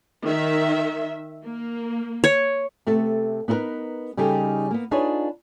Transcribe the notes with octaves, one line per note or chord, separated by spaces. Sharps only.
D#3 E5
A#3
C#5
C3 A3 B3 A4
B3 D#4 E4 G4 A#4 B4
C#3 G3 D#4 G4 A4
A#3 B3
D4 D#4 F4 G#4 B4 C#5